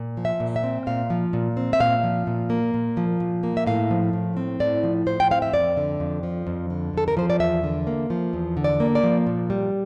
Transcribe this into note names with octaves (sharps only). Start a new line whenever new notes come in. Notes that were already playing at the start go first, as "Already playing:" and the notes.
Already playing: A#2
F3
E5
A#2
E5
C4
A#2 F5
F3
A#2
C4
E5
A#2 F5
F3
A#2
A#3
A#2
F3
A#2
A#3
E5
A2 F5
F3
A2
C4
A2 D5
F3
A2 C5
G5
C4 F5
E5
F2 D5
D3
F2
F3
F2
D3
F2 A4
A#4
F3 C5
D5
E2 E5
D3
A#3
F3
E2
D3
D5
A#3
D5
F3
A#2
G3